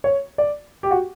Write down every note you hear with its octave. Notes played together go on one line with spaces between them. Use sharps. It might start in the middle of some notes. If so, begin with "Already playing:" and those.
C#5
D5
G4
F#4